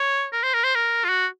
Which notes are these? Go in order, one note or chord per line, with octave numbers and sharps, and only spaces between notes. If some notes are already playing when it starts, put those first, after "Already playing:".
Already playing: C#5
A#4
C5
A#4
C5
A#4
F4
F#4